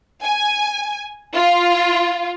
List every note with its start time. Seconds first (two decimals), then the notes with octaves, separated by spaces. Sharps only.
0.23 G#5
1.34 F4